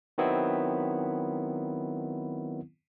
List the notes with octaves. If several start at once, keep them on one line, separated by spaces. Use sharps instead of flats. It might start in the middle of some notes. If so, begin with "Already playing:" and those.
D#3 F#3 B3 C4 E4